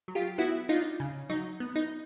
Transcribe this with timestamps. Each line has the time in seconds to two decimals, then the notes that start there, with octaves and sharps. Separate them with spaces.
0.08 F#3
0.15 F4 G4
0.38 B3 E4 F#4
0.69 D4 D#4 F4
1.00 C#3
1.30 F#3 D#4
1.60 B3
1.76 D#4